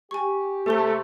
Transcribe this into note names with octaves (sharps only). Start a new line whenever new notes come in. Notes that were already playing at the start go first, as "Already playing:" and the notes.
G4 G#5 C#6
C3 A3 G4 C5 G7